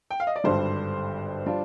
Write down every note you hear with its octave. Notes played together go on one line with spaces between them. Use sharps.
G5
F5
D#5
D5
G#1 G2 D3 G3 D4 C5
G3 D4 F4